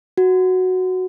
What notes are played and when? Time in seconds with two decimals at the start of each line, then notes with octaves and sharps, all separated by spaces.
0.17 F#4